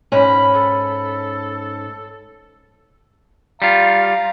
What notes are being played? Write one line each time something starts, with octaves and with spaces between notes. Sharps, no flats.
G#2 C#4 B5
A4
G3 F4 F5 A#5